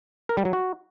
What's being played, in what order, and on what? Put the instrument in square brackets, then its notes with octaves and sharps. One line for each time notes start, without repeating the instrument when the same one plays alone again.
[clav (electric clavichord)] A#4
G3
F#3
F#4